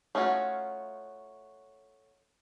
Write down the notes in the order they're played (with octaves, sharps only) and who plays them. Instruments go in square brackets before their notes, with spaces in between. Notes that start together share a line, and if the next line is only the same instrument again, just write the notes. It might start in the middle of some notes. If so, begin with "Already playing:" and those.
[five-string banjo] A3 C#4 D#4 F4 F#4